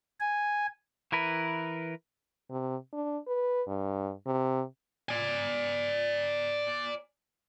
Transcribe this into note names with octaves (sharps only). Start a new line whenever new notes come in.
G#5
E3 E4 A#4 B4
C3
D4
B4
G2
C3
D5 G#5